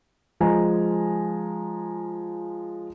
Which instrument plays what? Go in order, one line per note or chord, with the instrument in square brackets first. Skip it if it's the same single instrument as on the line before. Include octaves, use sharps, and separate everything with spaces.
[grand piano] F3 G#3 G#5 A#5